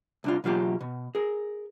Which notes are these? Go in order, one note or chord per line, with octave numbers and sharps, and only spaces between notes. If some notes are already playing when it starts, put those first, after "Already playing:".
C2 D4 F4
B2 F#3 F4 G4
B2
G#4 A#4